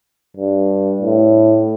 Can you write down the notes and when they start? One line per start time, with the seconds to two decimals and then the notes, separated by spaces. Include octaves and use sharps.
0.37 G2
1.01 A2